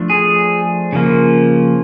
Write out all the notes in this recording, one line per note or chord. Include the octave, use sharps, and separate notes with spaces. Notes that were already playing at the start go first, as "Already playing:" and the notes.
Already playing: F3 A3 D4
G#4
C#3 F3 A#3